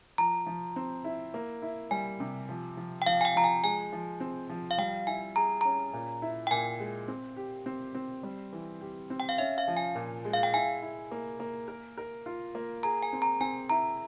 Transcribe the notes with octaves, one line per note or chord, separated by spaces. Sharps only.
F3 A#5
F3
C4
E4
A#3
E4
G3 G#5
C3
F3
F3
G5
F3 F5
G#5
G5
F3 A#5
G#5
G#3 G#5
F3
C4
F3
F5
G3 G5
E4 G#5
G#4 A#5
C#4 A#5
A#2
E4
G5
A#2 G#5
G#3
C4
G4
C4
C4
G3
E3
G4
C4
G5
F5
C#4 E5
F5
F3
G#5
A#2
G#3
F5
G5
E4 G#5
E4
A#3
A#3
A#4
A#4
F4
A#3
G#4 A#5
G#5
C4
A#5
C4 G#5
E4 A#5